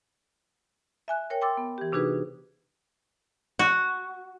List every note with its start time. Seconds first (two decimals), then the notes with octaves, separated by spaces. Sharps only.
1.08 E5 G#5 F#6
1.30 A#4 C#5 G5
1.42 G5 C6 D6 E6 A6
1.57 B3
1.78 E3 G4
1.92 C3 D4 D#4 F#4 G#4 B4
3.59 F#4